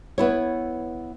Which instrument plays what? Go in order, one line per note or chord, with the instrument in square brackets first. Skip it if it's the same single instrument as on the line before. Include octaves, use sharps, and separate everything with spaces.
[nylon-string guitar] B3 E4 C#5